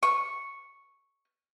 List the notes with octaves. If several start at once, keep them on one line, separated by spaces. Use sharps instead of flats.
C#6